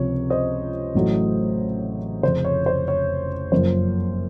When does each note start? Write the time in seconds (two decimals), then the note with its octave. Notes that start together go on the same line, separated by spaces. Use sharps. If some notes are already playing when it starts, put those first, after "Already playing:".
Already playing: C#2 C3 F3 C#5
0.30 C5 D#5
0.95 A1 A2 F#3 A3
2.23 F1 F2 C#3 C5
2.45 C#5
2.66 C5
2.88 C#5
3.52 F#1 F#2 C#3 F3 A#3 C5